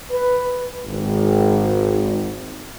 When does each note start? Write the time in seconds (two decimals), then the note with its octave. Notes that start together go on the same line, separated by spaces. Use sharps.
0.10 B4
0.85 G#1